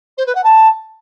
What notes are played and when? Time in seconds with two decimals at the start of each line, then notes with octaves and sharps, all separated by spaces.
0.17 C5
0.26 B4
0.35 F#5
0.43 A5